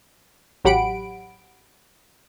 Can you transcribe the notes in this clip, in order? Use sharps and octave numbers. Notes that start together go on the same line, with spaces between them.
A1 F#3 G4 F#5 B5 D7